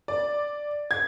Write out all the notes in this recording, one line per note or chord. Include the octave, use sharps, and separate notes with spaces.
D5
G#6